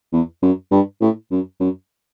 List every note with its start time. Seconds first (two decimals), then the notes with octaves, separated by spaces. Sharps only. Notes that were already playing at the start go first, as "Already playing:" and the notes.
0.12 E2
0.42 F#2
0.71 G2
1.01 A2
1.31 F#2
1.60 F#2